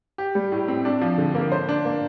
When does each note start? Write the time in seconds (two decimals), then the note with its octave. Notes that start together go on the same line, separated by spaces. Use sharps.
0.18 G4
0.35 G3
0.52 A2
0.68 C4
0.85 D4
1.01 F3
1.18 D3
1.35 A#3
1.52 C5
1.69 D4
1.85 A#3